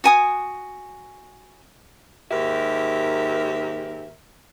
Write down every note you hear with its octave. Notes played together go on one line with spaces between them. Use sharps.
F#4 G#5 D#6
D#2 G#2 G4 A#4 E5